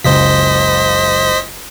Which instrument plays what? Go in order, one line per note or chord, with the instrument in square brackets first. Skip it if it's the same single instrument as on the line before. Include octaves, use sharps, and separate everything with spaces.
[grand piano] F#1 C#2 [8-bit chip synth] C5 D#5 B6